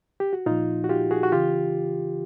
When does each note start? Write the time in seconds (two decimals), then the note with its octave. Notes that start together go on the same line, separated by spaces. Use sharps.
0.20 G4
0.33 F#4
0.46 A#2 F3 D#4 F4
0.84 F#4
0.89 F4 G4
1.11 F#4 G#4
1.23 F#4
1.32 C#3 E3 F4 G4